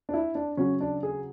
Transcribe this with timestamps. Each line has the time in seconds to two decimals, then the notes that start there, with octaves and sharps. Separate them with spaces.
0.09 D4
0.14 E4
0.35 D4
0.57 C#3 F#3 C#4
0.81 D4
1.03 G#4